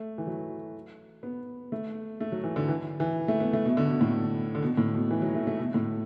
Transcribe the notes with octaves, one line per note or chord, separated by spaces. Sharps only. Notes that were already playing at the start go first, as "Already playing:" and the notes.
Already playing: A3
E3
F#3
B3
A3
A3
F#3
E3
D3
E3
E3
A3
B3
A3
B2
D3
B2
A2
D3
B2
A2
B2
E3
F#3
A3
A3
B2
A2